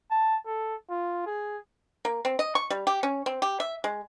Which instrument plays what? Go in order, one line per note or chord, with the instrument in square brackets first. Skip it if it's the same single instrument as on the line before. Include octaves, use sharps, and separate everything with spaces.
[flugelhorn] A5
A4
F4
G#4
[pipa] A#3
C4
D#5
C#6
G3
G4
C#4
C4
G4
E5
G#3